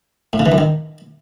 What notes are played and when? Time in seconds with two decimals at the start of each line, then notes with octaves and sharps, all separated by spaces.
0.33 A2
0.39 C#3
0.46 E3
0.52 F#2
0.58 D#3